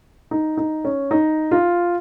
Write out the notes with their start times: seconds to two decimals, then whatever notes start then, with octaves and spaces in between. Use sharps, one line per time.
0.31 D#4
0.57 D#4
0.85 C#4
1.11 D#4
1.51 F4